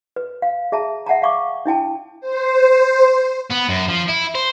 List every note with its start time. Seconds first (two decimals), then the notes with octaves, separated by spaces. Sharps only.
0.16 B4
0.42 F5
0.72 G#4 E5 A5 A#5
1.06 E5 F#5 A5 A#5
1.22 F5 C#6 D6
1.66 D4 E4 G5 A5
2.21 C5
3.50 B3
3.68 F#2
3.88 F3
4.08 E4
4.35 C5